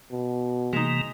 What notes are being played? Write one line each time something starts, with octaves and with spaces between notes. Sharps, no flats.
B2
C3 E3 G#3 A#3 D#4